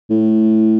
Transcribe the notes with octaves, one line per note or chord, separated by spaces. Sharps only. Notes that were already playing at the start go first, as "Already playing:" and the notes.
A2